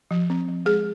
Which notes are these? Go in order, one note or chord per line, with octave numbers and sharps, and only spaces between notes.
F3
C4
F3
G#3 G#4